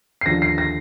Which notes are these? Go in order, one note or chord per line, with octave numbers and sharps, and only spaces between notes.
C7
D#2 D3 F3 A#6
C7
A#6